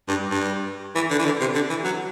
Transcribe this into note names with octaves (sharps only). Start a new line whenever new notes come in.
G2
G2
E3
D3
E3
D3
C3
D3
E3
F#3